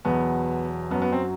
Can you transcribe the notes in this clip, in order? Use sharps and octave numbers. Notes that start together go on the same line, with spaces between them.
E2 B2 F#3 B3
F#2 F#3 B3
B3
C4